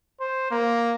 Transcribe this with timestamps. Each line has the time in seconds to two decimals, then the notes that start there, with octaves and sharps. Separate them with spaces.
0.20 C5
0.51 A#3